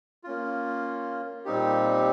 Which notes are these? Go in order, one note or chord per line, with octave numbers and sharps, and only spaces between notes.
A#3 C#4 F4
A#2 G3 C4 D#4 G4